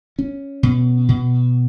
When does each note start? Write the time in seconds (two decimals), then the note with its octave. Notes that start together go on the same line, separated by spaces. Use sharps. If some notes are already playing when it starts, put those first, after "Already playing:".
0.19 C#4
0.63 B2
1.09 B2